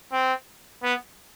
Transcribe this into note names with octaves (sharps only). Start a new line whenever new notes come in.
C4
B3